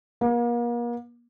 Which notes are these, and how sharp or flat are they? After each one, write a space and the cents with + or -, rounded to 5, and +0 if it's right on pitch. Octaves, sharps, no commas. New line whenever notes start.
A#3 +40